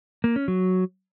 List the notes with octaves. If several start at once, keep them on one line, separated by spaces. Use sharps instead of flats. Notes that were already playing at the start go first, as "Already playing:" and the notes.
A#3
C#4
F#3